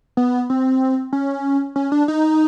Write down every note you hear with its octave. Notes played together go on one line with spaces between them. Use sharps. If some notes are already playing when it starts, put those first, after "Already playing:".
B3
C4
C#4
C#4
D4
D#4